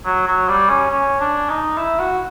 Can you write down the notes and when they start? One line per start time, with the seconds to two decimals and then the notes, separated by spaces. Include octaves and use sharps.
0.05 F#3
0.27 F#3
0.49 G3
0.69 C#4
0.91 C#4
1.20 D4
1.49 D#4
1.77 E4
1.99 F#4